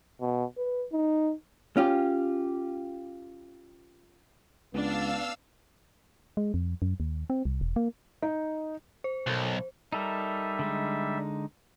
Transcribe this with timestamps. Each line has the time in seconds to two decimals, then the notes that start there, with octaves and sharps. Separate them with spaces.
0.21 B2
0.58 B4
0.92 D#4
1.77 C#4 F4 G4
4.73 C#2 B3 D4 F5 E6
6.37 G#3
6.54 F2
6.82 F#2
7.00 D#2
7.30 C4
7.45 C2
7.61 E1
7.76 A#3
8.22 D#4
9.04 C5
9.27 B1 B2 A4 A#4
9.92 G3 D#4 A4 A#4 E5
10.59 D3 G#3 D#4